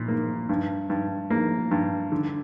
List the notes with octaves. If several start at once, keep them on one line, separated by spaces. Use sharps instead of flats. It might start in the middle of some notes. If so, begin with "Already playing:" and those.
Already playing: A#2
A#3
G2
G2
A#3
G2
D3